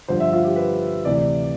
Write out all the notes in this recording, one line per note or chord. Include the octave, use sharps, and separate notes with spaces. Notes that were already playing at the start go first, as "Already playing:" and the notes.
G2 D3 F3 C5
E5
F4
G4
B4
D2 C3 E3 D5